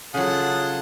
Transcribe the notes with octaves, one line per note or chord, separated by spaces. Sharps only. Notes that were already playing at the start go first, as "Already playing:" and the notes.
C#3 F#3 F4 G#4 A4 F#5